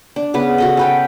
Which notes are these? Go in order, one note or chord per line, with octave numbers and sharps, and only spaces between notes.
D4
C#3 B3 B4
F#4 A4 D#5
C#4 B4 G5